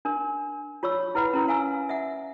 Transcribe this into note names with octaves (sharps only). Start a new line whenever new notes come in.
D4 A#4
F4 C#5 C#6 E6
E4 B4 F#5 B5
C#4 E4 A#4
E4 F5 G#5 E6
E5 F#5